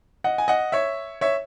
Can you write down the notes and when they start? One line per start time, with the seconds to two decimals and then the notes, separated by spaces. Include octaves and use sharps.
0.24 D#5 F#5
0.38 G#5
0.48 D#5 F#5
0.72 C#5 E5
1.21 C#5 E5